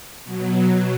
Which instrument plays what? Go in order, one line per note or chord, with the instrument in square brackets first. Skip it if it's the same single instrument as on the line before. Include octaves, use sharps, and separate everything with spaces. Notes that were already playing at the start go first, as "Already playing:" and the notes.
[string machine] B2 F#3